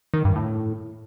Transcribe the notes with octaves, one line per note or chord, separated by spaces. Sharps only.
D#3
G2
A2